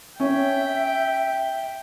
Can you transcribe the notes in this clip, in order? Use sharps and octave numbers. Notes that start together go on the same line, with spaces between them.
C#4 E5 G5